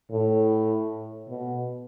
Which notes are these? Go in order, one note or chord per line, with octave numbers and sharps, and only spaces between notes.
A2
B2